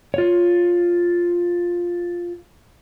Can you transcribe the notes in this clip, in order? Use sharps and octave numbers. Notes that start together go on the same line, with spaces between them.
F4 C#5